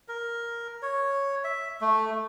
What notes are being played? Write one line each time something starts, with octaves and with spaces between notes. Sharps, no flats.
A#4
C#5
E5
A3